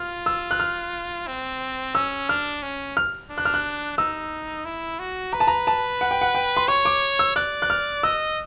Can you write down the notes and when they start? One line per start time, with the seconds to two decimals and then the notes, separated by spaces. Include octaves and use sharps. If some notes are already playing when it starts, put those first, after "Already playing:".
Already playing: F4 F6
0.26 E6
0.51 F#6
0.60 F6
1.27 C4
1.95 C#4 E6
2.29 D4 F6
2.63 C#4
2.97 F6
3.30 D4
3.38 F#6
3.45 F6
3.54 F#6
3.98 D#4 E6
4.65 E4
5.00 F#4
5.33 B4 A#5
5.40 A5
5.47 A#5
5.67 A5
6.01 F#5
6.11 G5
6.21 F#5
6.35 G5
6.57 C6
6.68 C#5 C#6
6.85 D6
7.19 E6
7.36 D5 F#6
7.62 F#6
7.70 F6
8.03 D#5 E6